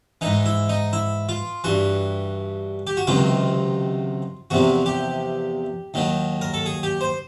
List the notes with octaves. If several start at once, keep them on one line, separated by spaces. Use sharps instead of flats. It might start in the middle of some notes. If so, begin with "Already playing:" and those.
G#2 E3 D#4
E4
D#4
E4
F4
G2 E3 F#4
G4
F#4
C#2 C3 D#3 F#3 F4
E2 C3 F3 F#4
G4
D#2 D#3 F#3
A#4
A4
G#4
G4
C5